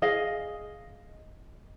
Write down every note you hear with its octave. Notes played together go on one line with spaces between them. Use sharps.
G#4 D#5 F5